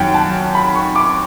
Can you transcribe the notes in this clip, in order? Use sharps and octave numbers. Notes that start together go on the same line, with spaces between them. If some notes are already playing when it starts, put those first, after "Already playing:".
Already playing: F#2 D#3 F#3 F#5 G5
A5
B5
C#6
D6